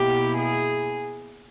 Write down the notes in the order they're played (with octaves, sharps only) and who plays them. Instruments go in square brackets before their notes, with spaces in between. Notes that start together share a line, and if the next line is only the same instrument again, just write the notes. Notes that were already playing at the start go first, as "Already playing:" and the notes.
Already playing: [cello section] B2 A#3 E4 G4
G#4